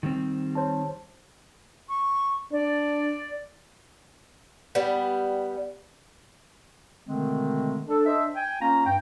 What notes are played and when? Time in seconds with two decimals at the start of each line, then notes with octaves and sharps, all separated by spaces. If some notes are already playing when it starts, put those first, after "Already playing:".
0.03 D#3 G3 C4
0.55 C5 C#5 A5
1.89 C#6
2.52 D4 D5
4.75 G3 B3
7.06 B2 D3 D#3 G#3 A3 C4
7.88 D4 A4
8.06 D4 C5 D#5 E5
8.35 G5 G#5
8.61 A#3 C#4 F4 F5 A#5
8.86 G2 G5